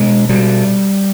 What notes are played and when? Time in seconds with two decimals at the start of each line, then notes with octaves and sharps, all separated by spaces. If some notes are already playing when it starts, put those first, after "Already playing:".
Already playing: B2 G#3
0.29 B2 G3